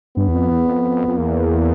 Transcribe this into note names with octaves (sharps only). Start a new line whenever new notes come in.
G2 B3
E2
F2
E2
F2
F2
E2 A#3